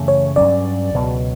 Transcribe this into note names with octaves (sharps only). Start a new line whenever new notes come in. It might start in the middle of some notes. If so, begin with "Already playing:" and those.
Already playing: F#2 C#3 E3 A3
C#5
G2 F#3 C#4 D5
C#2 B2 F#3